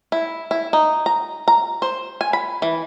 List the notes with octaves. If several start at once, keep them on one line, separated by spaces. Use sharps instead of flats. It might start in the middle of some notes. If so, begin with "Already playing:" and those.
E4
E4
D#4
A#5
A#5
C5
G#5
B5
E3